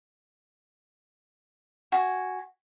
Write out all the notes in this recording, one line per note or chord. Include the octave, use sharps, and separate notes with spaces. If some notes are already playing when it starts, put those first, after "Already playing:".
F#4 G#5